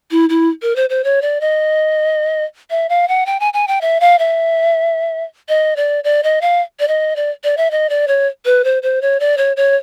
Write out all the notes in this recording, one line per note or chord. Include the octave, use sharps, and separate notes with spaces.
E4
E4
A#4
C5
C5
C#5
D5
D#5
E5
F5
F#5
G5
G#5
G#5
G5
E5
F5
E5
D#5
D5
D5
D#5
F5
D5
D#5
D5
D5
E5
D#5
D5
C#5
B4
C5
C5
C#5
D5
C#5
C#5